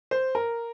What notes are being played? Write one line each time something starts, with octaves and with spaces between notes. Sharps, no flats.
C5
A#4